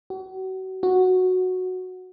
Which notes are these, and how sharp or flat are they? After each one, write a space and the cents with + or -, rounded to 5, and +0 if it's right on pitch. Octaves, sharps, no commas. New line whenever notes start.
F#4 +35
F#4 -5